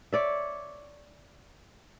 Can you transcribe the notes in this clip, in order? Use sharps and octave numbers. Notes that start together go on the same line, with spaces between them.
C#5 D5 E5